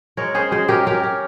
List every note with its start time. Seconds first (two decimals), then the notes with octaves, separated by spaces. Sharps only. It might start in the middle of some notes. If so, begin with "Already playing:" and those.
0.17 G#3 A#4 C#5
0.34 C#4 G#4 C5
0.52 G#3 G#4 C5
0.68 C#4 G4 A#4
0.86 C#4 G4 A#4
1.03 C#4